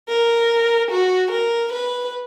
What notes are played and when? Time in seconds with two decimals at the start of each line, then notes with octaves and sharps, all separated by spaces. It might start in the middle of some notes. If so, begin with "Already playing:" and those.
0.09 A#4
0.91 F#4
1.31 A#4
1.72 B4